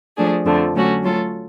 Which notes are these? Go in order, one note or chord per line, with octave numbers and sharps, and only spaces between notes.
F3 A3 D4 G#4
F2 D3 F3 A3
D3 F#3 A3 C#4 F#4
F#3 A3 F4 A4 C#5